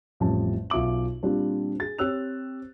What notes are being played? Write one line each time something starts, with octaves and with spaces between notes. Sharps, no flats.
A1 F2 A2 G3 A5
B1 F4 E5 D6 F#7
A#2 G3 C4 D4 F4 G4
G#4 A6
C4 G4 C#5 E6 F#6 F7